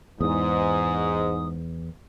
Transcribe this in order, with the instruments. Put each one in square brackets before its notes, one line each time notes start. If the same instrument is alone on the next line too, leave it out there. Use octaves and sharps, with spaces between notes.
[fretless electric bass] E2 [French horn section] G#2 [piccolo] D#6